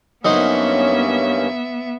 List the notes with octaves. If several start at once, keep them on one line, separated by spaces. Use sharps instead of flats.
G2 F#3 A#3 B3 C#4 D#4 C5 E5